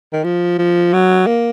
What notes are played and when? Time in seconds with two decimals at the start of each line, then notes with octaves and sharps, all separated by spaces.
0.13 D#3
0.24 F3
0.58 F3
0.93 F#3
1.27 A#3